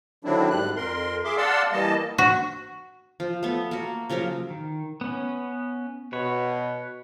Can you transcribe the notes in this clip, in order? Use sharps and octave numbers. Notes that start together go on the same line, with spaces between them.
D3 D#3 F#3 C4 D4 E4
G#2 G3 F#6
F2 A#4 C6
G#4 E5 C6 D6
D5 F5 F#5 A5 C6 E6
E3 G3 A#3 D#5 A5
F#4
F3
A3 B3
A#3 F#4
C#3 F3 F#3 A#4
D#3
B3 C#4
B2 B4 C#5